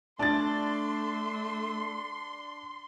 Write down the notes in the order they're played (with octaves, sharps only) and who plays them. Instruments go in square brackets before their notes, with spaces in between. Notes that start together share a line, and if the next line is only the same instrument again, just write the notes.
[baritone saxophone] A3 [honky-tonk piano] D4 A6 [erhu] C6